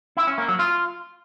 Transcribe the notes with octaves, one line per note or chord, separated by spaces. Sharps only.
E4
C#4
A#3
F#3
F4